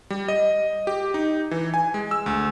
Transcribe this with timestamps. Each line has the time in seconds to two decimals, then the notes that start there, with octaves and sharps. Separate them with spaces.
0.10 G3
0.28 D#5
0.87 G4
1.14 D#4
1.51 E3
1.74 G#5
1.94 G#3
2.11 E6
2.26 D2